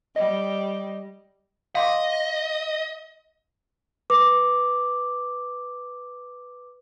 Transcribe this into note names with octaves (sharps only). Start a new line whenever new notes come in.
G3 D#5
D#5 F5 C6 D6
B4 D6